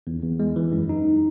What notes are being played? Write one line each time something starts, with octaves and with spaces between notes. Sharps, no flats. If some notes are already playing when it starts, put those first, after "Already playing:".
E2
E2
G#3
E3
F#2
D#4